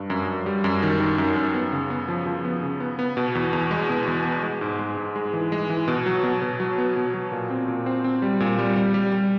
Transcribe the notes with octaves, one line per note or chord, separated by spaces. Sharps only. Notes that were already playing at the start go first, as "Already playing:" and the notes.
Already playing: G2
F#2
F#2
G3
F#2
D#3
D#3
F#2
F#2
B3
C#3
B3
F3
F3
B3
C#3
B3
B3
B2
E2
E2
G#3
B2
E2
B3
G#3
G#2
G#3
G#2
G#3
E3
G#3
E3
B2
F#3
B2
B2
F#3
B3
B2
F#3
A#2
C4
A#2
C4
C4
G3
A#2
G3
G3
G3
G3